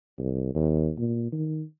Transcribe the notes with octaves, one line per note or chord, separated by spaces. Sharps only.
C2
D#2
A#2
D#3